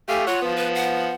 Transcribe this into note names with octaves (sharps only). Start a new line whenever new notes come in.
A3 G4 F5 G#5
F4 C#5 F#5
F3 B3
B4
F#5